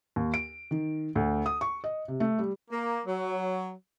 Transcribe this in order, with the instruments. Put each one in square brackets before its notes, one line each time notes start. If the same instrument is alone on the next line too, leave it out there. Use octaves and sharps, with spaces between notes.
[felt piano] D#2
D7
D#3
D2
D#6
C#6
D#5
C3
A3
G3
[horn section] A#3
F#3